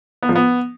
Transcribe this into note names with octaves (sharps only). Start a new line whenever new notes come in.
B3
F3
B3